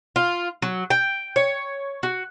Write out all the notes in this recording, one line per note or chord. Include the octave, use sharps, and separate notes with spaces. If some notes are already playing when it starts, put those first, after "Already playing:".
F4
F#3
G5
C#5
F#4